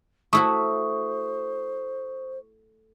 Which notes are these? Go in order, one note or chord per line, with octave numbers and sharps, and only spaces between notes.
A3 E4 F#4 C5 C#6 D#6